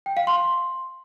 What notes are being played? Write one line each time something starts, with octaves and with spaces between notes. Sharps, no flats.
G5
F5
C6